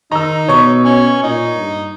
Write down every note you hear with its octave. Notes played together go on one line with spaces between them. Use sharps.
D#3 D#4 A#5 E6
B2 C#5 C#6
C#4
A#2 D#4
G2